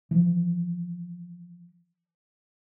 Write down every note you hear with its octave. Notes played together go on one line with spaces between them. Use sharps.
E3 F3